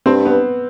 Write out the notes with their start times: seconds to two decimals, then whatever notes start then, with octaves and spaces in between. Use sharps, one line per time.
0.06 G2 C4
0.25 B3